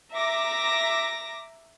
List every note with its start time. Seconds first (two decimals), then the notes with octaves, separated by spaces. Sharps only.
0.12 E5 A#5 D6 A#6